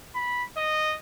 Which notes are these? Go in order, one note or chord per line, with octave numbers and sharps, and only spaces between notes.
B5
D#5